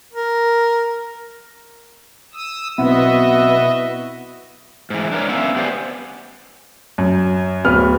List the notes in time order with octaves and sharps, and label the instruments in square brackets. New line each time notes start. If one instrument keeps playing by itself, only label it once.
[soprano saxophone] A#4
[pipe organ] D#6 E6
[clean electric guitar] B1 C4 [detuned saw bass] B3 [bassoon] E4 [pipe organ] F#4 D#5 E5
[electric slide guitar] G#2 E3
D4 A#4 C#5
B3 C#4 E5 F5
B3 G4 B4 C5 D5 G#5
[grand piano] F#2
D1 B3 F6